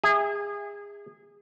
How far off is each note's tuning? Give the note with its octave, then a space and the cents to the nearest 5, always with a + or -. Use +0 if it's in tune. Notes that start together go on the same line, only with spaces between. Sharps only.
G#4 -30 E5 -15